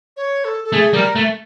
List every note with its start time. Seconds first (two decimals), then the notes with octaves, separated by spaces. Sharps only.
0.17 C#5
0.45 A4
0.64 A4
0.72 A3 G#4
0.93 G3 A#4
1.16 A3